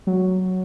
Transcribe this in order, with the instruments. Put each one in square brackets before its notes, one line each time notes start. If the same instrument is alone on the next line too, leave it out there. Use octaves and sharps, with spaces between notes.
[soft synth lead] F#3